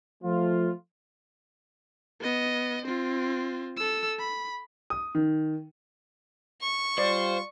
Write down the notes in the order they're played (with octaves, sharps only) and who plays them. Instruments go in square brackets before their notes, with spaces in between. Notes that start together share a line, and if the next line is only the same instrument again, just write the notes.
[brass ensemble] F3 A3 F4
[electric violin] B3 D#5
C4 F4
A4 E6
B5
[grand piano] D#6
D#3
[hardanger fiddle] C#6
[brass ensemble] G3 F4 [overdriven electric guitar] C5 [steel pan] D5